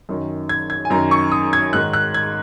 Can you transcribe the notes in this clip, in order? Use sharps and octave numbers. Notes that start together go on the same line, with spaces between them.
F#2 D#3
G#6
G#6
G#5
F#2 D#3 A#5
C#6
D#6
G#6
G#2 D#3 F#6
F#6
G#6